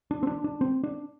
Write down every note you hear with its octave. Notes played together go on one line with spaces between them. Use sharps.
D4
C4
D4
D4
C4
D4